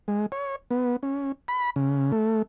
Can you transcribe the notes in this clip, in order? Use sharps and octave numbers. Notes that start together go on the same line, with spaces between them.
G#3
C#5
B3
C#4
B5
C#3
A3